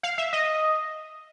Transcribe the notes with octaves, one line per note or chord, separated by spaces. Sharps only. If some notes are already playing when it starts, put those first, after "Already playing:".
F5
E5
D#5